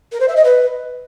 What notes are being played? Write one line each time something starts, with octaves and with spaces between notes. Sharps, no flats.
A#4
C5
E5
D#5
B4